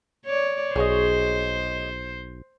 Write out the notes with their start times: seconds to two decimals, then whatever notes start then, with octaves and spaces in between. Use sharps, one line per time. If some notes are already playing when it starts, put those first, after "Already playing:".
0.26 C#5 D5
0.76 B1 G#4 C5 C#5 D#5